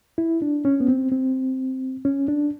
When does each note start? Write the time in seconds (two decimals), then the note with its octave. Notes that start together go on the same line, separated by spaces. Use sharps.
0.18 E4
0.42 D4
0.65 C#4
0.80 B3
0.88 C4
1.12 C4
2.05 C#4
2.28 D4